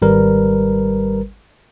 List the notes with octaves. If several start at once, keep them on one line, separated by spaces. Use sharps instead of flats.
G#1 G3 A#4 B4